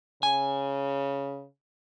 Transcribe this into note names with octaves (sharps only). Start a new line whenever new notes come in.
C#3 G#5